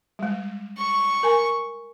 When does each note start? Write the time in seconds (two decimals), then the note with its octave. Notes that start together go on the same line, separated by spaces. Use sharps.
0.19 G3 G#3
0.78 C#6
1.23 A#4 G#5 A#5